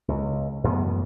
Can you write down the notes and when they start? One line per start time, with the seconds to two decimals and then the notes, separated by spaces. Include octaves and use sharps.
0.08 C#2
0.64 F#2 A2 E3 B3